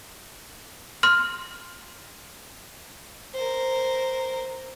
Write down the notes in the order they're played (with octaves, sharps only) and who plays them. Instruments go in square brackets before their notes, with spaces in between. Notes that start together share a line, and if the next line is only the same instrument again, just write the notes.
[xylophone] C6 F6
[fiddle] A#4 C5